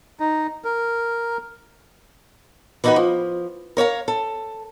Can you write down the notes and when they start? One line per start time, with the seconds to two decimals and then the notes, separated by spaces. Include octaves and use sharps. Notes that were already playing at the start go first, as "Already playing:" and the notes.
0.20 D#4
0.65 A#4
2.84 E3 B3 D#4 F4 F#4 B4
2.96 F3
3.77 A#4 C#5 F5 A#5
4.08 A4